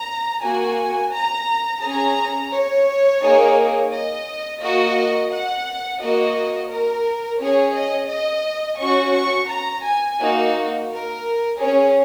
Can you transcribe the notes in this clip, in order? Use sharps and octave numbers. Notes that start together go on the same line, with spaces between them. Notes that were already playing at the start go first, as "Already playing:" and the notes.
Already playing: A#5
A#3 F#4 G#5
A#5
C#4 G#4 A#5
C#5
A#3 D#4 G#4
D#5
A#3 F#4 D#5
F#5
A#3 F#4 D#5
A#4
C#4 G#4 C#5
D#5
D#5
C#4 F#4 C#6
C#6
A#5
G#5
A#3 D#4 F#4
A#4
C#4 G#4 C#5